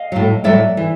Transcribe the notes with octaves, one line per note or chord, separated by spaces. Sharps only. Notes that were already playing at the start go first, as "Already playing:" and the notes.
Already playing: D#5 F5
A2 F#3
A2 F#3 D5 E5
E3